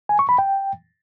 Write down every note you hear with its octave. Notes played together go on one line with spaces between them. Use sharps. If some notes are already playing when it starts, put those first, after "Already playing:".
G#5
C#6
B5
G5